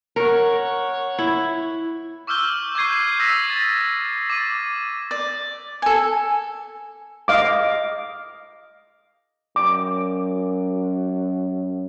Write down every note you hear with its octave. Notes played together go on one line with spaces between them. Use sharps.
A#4 C#5 F#5
E4
C#6 D6 E6 F6 G6 G7
C#6 D6 G6 G#6 C7 D#7
D#6 E6 A#6 B6
A6
D6 A6 D#7
D5
A4 G#5
D#5 F5 D6
F#2 D6